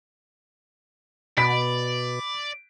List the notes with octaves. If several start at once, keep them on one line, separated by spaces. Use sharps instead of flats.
B2 D5 B5 B6